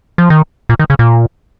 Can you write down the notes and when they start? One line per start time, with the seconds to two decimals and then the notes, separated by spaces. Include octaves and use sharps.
0.18 F3
0.30 D#3
0.69 A#2
0.79 D#3
0.90 C#3
0.99 A#2